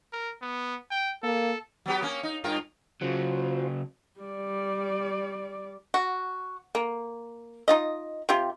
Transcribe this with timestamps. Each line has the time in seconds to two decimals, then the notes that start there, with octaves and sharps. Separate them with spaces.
0.13 A#4
0.42 B3
0.91 G5
1.23 A#3 A4
1.86 F#3 B3 G4
2.02 A#3 C#4
2.23 D#4
2.44 G2 F4 A#4
3.02 C#3 F#3 F4 F#4 C5
4.20 G3 D5
5.94 F#4
6.75 A#3
7.68 D#4 F4 D#5
8.29 C3 F4 G4